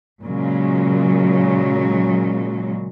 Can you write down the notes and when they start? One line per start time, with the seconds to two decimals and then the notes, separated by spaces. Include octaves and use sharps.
0.22 A#2 C#3 F#3 G#3